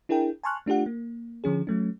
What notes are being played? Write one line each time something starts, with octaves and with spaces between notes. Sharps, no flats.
D4 E4 G#4 A#4 G5
G#5 A5 C6 C#6 F6 F#6
A3 D4 F4 G4 F#5
A#3
D3 F3 C#4 G#4
F#3 A3 C#4